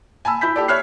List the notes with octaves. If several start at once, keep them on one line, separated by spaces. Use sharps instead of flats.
G#5 A5 B5 E6
E4 B5 G6 B6
G4 A4 D5
C#5 E5 B5 F6 F#6 C7